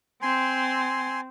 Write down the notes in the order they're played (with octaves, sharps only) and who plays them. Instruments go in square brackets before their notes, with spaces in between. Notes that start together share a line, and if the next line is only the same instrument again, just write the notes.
[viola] C4 [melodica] G#5 C6